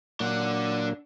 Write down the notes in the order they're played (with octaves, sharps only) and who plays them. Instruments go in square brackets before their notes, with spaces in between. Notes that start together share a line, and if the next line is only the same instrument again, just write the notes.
[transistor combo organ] A#2 F#3 A#3 [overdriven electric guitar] D4 F#5